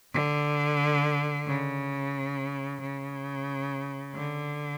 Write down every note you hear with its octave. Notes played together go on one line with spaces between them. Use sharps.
D3
C#3
C#3
D3